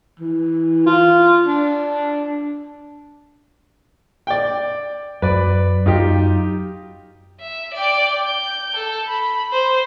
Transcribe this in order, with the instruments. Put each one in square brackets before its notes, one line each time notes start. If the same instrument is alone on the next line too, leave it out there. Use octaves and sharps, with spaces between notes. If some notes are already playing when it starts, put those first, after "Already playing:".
[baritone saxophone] E3
F4
D4
[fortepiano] D5 G5
[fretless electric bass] F#2 [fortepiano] B4 D5
[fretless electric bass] F#2 [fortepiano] D#4 F4 G4
[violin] E5
D5 G5
G6
A4
B5
C5